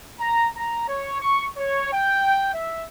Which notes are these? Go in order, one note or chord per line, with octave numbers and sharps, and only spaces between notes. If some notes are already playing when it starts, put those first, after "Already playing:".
A#5
A#5
C#5
C#6
C#5
G5
E5